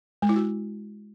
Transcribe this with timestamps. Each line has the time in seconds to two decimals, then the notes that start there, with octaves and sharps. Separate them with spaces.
0.22 G#3
0.29 E4
0.36 F#4